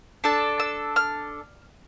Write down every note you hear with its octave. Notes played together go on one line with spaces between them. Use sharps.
D4 A4 A5
E6
F6